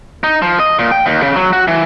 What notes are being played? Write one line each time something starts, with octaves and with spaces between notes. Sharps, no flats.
D#4
F3
D#5
A#2
G5
D#2
C#3
F#3
F#4
E3